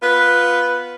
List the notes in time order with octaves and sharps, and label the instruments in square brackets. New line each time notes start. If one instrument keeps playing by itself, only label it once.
[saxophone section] B3 F4 B4